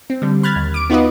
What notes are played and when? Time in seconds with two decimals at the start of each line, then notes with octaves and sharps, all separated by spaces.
0.10 C4
0.22 D3 G3
0.43 B5 F6 F#6 G#6 A6
0.56 D#2
0.74 D6 D7
0.90 B3 D#4 F4 F#4 B4 D#5